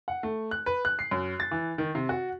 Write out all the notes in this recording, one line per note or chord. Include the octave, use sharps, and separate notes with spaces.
F#5
A3
F#6
B4
F#6
C7
F#2
A6
E3
D#3
C3
F#4